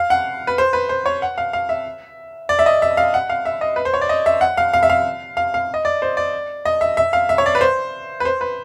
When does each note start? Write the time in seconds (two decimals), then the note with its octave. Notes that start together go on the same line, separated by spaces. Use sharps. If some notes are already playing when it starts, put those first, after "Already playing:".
Already playing: F5
0.10 F#5
0.47 B4
0.58 C5
0.73 B4
0.89 C5
1.06 C#5
1.22 F#5
1.38 F5
1.53 F5
1.69 E5
2.49 D5
2.59 E5
2.66 D#5
2.82 E5
2.97 F5
3.14 F#5
3.30 F5
3.45 E5
3.61 D#5
3.76 B4
3.85 C5
3.94 C#5
4.01 D5
4.09 D#5
4.26 E5
4.41 F#5
4.57 F5
4.73 F5
4.83 E5
4.90 F5
5.37 F5
5.54 F5
5.74 D#5
5.85 D5
6.02 C5
6.17 D5
6.65 D#5
6.81 E5
6.97 E5
7.13 F5
7.29 E5
7.38 C#5
7.46 D5
7.55 B4
7.61 C5
8.20 B4
8.25 C5
8.41 B4